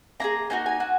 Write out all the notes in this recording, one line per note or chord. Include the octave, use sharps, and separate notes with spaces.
A#3 E4 G#4 A#5
A#3 D#4 F#4 G#5
G#5
F#4